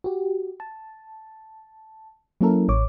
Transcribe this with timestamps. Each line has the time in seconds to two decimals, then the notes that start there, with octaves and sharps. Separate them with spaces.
0.04 F#4 G4
0.60 A5
2.41 F#3 A#3 C#4 E4 A4 A#4
2.68 A1 C#5 D6